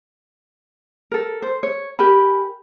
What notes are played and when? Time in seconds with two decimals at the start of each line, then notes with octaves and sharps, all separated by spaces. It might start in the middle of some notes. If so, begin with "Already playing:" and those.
1.11 A4 A#4
1.42 C5
1.63 C#5
1.99 G4 A#4 G#5 B5